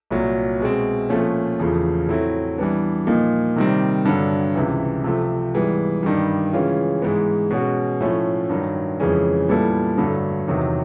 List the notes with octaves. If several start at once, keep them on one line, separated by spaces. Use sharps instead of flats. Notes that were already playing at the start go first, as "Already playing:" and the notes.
C2 A#2 F#3
B2 G#3 C4
A#2 F3 A3 C#4
E2 C#3 F3 A3
A2 F#3 A3 C4 E4
E3 G3 B3 D4
A#2 F3 A#3 D#4
C3 D#3 G3 C4
G2 D3 F#3
C#2 C3 E3
C3 F3 A3
G#2 E3 G3 B3
G2 D#3 G3
C#3 E3 G#3 C#4 F4
G#2 E3 G#3 B3
B2 G#3 C#4 F#4
A2 F3 A3 C#4
G2 D#3 F#3
F2 C#3 E3 G#3 C#4
A#2 G3 B3 E4 A4
G2 D3 F#3 A3
E2 C3 D#3 F#3 B3